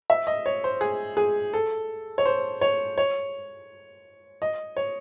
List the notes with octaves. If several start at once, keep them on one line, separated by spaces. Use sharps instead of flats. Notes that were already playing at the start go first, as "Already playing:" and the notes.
E5
D#5
C#5
C5
G#4
G#4
A4
C#5
C5
C#5
C#5
D#5
C#5